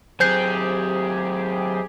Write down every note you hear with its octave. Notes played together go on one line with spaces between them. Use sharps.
F#3 C4 G4 G#4 C5 G6 C7